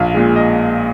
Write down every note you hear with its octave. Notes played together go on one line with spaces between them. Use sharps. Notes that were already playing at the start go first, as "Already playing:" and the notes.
Already playing: A#1 F5
A#2 G#3
D#5